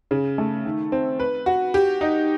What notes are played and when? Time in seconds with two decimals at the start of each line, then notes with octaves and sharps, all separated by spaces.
0.11 C#3
0.38 A3
0.65 D#3
0.92 C4
1.19 B4
1.46 F#4
1.74 G4
2.01 D#4